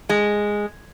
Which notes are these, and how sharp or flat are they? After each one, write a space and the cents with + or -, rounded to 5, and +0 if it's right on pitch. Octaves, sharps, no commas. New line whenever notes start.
G#3 -5